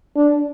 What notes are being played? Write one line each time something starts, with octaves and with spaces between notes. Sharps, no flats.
D4